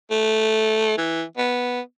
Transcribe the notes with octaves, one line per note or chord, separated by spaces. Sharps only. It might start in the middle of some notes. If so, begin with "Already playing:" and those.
A3
E3
B3